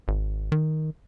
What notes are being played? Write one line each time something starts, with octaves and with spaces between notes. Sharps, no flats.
G#1
D#3